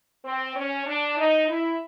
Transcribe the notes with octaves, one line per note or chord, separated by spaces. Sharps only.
C4
C#4
D4
D#4
E4